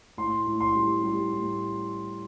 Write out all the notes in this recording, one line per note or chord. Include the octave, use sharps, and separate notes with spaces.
A2 C6
A2
C6
G3
G3
A2